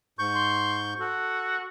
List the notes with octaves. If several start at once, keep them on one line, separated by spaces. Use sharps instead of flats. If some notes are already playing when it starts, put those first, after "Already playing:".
G#2 C#6 G6
C6
F#4 A4